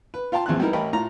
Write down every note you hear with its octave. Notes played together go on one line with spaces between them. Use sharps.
B4
F4 F5 G5 A5 C6
A#1 E2 C4 A5 F#6
G3 B3 D#4 E4 A#4
A1 A#4 D#5 G5 A5 B5
A2 F4 A#5